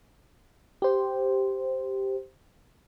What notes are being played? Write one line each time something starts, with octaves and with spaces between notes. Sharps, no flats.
G4 C5